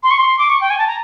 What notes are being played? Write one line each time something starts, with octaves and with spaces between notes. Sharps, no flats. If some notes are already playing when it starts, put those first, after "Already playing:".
C6
C#6
C6
D6
C#6
G5
G#5
A5
A#5